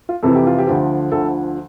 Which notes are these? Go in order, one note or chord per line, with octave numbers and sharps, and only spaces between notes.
F4
F2 C3 E3 A4
G4
F4
G4
D2 D3 F3
D2 D3 F3 A4